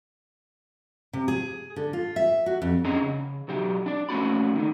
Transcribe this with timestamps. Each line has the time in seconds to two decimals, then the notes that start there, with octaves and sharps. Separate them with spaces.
1.13 C3
1.28 G#4
1.76 D3
1.93 F4
2.16 E5
2.46 F#4
2.62 F2
2.85 C#4 D4 G#4 D#5 A#5
3.02 C#3
3.48 B1 F#3 G4
3.86 D4 D5
4.09 A#2 A3 C#4 F#4 B5
4.56 D3 D#3